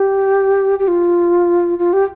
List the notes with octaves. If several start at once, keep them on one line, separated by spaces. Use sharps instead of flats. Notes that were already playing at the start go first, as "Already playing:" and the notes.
Already playing: G4
G4
F4
F4
G4